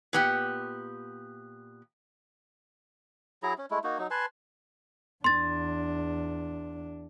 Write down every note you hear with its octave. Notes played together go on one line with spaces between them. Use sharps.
A#2 B3 G4
F#3 E4 G#4 A#5
C#4
G#3 A3 E4
A#3 D#4 F#4
F#3 D#4
B4 G#5 A5 C6
E2 D4 C6 A6